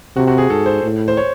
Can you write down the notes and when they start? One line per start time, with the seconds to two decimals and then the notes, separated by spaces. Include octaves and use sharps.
0.16 C3 F#4
0.27 F#4
0.38 G#4
0.50 G#2 A4
0.66 C5
0.83 A2
1.08 C5
1.17 C#5